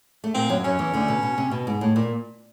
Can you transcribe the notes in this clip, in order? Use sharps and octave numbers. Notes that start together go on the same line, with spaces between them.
A3
A#2 A#3 C4
F#2 F#3
F#2 F#3 C#4
E2 E3
D2 D3
B2
B2
C3
B2
G#2
A2
A#2